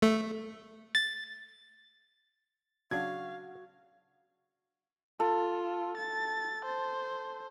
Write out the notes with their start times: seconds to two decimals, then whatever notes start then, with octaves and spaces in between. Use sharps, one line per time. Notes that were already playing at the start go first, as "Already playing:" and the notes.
0.02 A3
0.95 A6
2.91 C#3 F#3 D4 F#4 F5 G#6
5.20 F4 A4
5.97 A6
6.65 C5